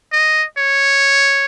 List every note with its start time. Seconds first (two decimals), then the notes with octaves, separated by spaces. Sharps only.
0.12 D#5
0.58 C#5